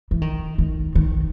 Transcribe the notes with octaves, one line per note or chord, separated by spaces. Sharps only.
E3
D#3
D#3
D#3